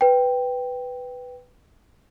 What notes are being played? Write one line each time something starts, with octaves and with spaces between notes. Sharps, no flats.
B4 G5